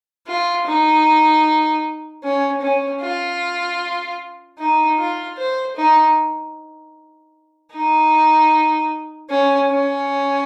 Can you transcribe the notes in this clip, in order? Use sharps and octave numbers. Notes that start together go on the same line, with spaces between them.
F4
D#4
C#4
C#4
F4
D#4
F4
C5
D#4
D#4
C#4
C#4